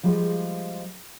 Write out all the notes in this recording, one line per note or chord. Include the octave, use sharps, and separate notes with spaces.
F3 G3 G#3